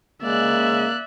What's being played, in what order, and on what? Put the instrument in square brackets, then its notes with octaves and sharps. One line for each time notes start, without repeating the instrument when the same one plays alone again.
[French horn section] C#3 G#3 [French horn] A#3 [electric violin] D5 F#6 [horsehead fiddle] E5